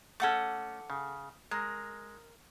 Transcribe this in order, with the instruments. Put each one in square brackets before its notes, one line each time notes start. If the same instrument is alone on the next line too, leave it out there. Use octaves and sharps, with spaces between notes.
[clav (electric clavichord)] A3 C#4 [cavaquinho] A4 F#5 D6
[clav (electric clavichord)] C#3
[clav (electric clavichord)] G#3 [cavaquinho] A#4